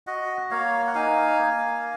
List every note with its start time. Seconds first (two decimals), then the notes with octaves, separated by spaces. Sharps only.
0.07 F#4 D#5 F#5
0.51 A#3 C#5 F5
0.87 F#5
0.94 D#4 F5 G#5
1.39 A#3